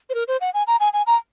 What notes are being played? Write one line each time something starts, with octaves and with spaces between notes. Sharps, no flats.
C5
A#4
C5
F#5
G#5
A#5
G#5
G#5
A#5